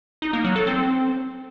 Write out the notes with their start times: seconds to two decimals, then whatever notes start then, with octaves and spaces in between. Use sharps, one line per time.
0.22 D#4
0.33 A#3
0.44 F#3
0.56 A4
0.67 C4